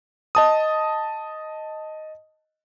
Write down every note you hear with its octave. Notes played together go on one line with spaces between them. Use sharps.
D#5 A5 D#6